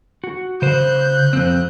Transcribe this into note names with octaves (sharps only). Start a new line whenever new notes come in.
F#4
C#3 C5 F#6 G6
F2 C4